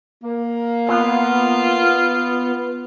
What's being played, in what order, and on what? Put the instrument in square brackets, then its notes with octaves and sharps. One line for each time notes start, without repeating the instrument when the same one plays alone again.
[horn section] A#3
[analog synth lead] B3 [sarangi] F4